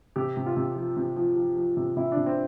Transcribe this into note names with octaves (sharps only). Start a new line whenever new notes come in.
C3 G4
C3
F4
C3
F3
C3
F3
F3
F3
C3
C3 E4
D4
C3
C4